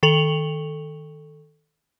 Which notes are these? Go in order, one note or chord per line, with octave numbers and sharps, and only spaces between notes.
D#3 A4 F7 F#7